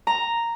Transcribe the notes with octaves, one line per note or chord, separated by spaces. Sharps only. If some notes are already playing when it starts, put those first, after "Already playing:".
A#5